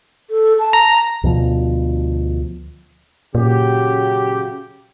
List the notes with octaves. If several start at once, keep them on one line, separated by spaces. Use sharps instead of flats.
A4
A5
A#5
D2 B2 F3
A#2 C#3 F#3 G4